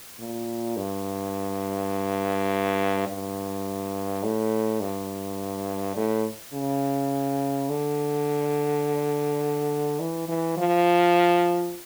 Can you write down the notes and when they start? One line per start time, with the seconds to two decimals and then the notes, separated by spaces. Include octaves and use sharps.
0.19 A#2
0.77 G2
3.07 G2
4.23 A2
4.81 G2
5.96 A2
6.53 C#3
7.69 D3
10.00 E3
10.28 E3
10.57 F3